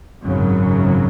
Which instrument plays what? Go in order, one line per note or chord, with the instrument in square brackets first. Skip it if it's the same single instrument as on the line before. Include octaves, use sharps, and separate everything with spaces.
[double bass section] G#1 F#2 C#3 F#3